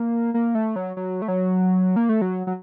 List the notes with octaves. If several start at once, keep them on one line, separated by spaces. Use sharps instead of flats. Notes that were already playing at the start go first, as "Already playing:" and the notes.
Already playing: A#3
A#3
A3
F#3
F#3
A3
F#3
A#3
A3
F#3
F#3